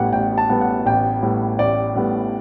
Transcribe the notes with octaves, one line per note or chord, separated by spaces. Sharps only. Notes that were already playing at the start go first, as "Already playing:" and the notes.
Already playing: A1 A2 G3 B3 F#5 G5
A1 G5
A5
A2 G3 B3
F#5
A1 G5
A2 G3 B3
A1 D5
A2 G3 B3